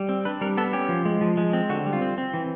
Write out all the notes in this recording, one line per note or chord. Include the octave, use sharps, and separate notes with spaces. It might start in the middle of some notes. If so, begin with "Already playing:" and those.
Already playing: G3
C4
D4 B4
G3 A#4
B3 A4
C#4 G4
F3
G#3
F3
G#3
C4
D3 F#4
G3
F4
C4
C4
E3